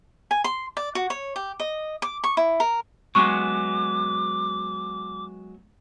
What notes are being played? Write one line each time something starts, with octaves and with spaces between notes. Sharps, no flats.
G#5
C6
D5
F#4
C#5
G4
D#5
D6
C#6
E4
A#4
F#3 G#3 B3 C#6 D6